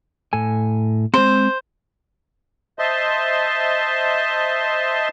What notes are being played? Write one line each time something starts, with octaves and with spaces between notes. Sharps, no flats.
A2 A4 G#5
G#3 C4 C5
C5 D#5 E5 A5 C6